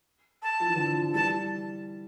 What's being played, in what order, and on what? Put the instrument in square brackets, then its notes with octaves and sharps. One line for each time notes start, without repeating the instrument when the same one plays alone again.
[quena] A5
[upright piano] F3
E3
D3 F3
F3
[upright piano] E3 G3 [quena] A5